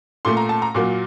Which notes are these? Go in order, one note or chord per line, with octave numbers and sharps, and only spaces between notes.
A#2 A3 C6
A#5
A5
A#5
A#2 F#3 A#3